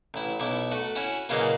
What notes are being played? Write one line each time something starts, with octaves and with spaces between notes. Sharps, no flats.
A1 E4
B1 E4 C#6 D6
A3 F#4
C#4 E4 F#4
A#2 C#3 E3 F#3 G#3 A#3